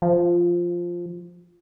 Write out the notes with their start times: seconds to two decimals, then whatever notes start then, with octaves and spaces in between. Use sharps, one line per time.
0.02 F3